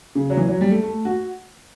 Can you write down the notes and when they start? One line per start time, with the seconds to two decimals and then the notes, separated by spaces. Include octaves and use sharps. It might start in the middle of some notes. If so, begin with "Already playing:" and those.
0.15 C#3
0.30 F#3
0.37 E3
0.48 F#3
0.61 G3
0.71 A3
0.83 A3
1.05 F#4